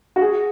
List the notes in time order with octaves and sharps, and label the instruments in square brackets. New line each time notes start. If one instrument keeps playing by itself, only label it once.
[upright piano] F#4
G#4